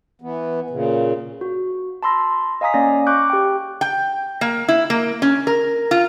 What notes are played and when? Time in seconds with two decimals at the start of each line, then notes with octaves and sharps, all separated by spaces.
0.22 E3 B3
0.70 A#2 C#3
1.41 F#4
2.03 A5 B5 C6 E6 A#6
2.61 D#5 F5 G#5 A#5 D#6 B6
2.74 A#3 C#4 C#5 D5 G#5 A#6
3.07 C#6 D6 F#6 G6
3.30 G4 G5
3.81 G5
4.41 A#3
4.68 E4
4.90 A#3
5.22 C#4
5.47 A#4
5.91 F4